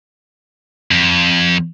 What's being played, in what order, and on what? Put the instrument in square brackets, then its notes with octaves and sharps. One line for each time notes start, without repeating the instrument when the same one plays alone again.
[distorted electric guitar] F2